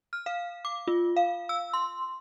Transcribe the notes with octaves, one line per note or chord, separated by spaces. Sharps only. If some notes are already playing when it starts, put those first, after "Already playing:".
F6
F5
D6
F4
F5
E6
C6